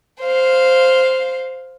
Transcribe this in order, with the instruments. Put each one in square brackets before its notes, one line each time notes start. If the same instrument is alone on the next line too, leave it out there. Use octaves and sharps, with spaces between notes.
[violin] C5 F5